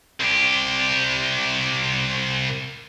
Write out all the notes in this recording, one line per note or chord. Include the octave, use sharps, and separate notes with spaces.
C2 G4